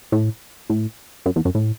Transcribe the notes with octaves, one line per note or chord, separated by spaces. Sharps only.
A2
A2
F#2
E2
F#2
A2